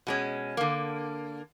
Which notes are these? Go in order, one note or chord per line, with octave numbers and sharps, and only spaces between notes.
B2 G#3 C#4
D3 A#3